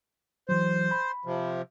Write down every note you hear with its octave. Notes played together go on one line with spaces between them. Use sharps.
E3 F#3 C5
B5
C3 F3